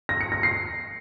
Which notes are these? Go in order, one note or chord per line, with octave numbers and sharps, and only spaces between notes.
A#6
C#7
A#6
C7